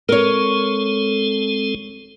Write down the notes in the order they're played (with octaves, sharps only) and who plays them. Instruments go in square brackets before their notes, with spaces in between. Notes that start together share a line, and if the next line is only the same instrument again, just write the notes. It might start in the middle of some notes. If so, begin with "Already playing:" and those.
[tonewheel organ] G#3 C4 A4 [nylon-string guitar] A#4 C#5